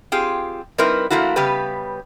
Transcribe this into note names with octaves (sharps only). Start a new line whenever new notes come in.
C4 F4 G4 G#4
G3 C4 D#4 E4 A#4 B4
F3 A3 A#3 E4 F#4
C#3 G3 B3 G4 B4